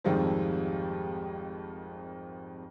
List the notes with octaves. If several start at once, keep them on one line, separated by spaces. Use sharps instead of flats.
G#1 F2 D#3 F3 G3 G#3